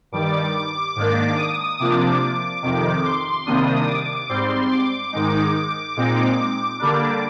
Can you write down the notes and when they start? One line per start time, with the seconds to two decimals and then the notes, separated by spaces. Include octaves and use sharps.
0.12 G2 D#3 G3 D6
0.96 G#2 D#3 A#3 D4
1.37 D#6
1.79 C3 F3 A#3 D4 D6
2.62 F2 C3 D#3
3.05 C6
3.46 C3 D#3 G3 A#3 D4 D#6
3.88 D6
4.29 G#2 G3 C4 C6
4.71 D6
5.13 G#2 D#3 G#3 D#4
5.54 D6
5.96 A#2 G#3 C4 D#4
6.79 D3 G3 A#3 D4 D6